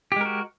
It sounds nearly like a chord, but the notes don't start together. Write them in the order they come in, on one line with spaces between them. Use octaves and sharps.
G4 G#3 A#4 F#4